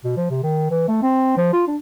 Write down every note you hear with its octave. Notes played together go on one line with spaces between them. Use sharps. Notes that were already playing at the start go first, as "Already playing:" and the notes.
B2
F3
C3
D#3
E3
A3
C4
F3
F4
D4